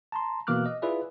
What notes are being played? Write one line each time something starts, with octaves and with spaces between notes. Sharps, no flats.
A5 A#5 C6
B2 E3 A#3 D6 F6 F#6
D#5
E4 F4 G#4 B4 D5 E5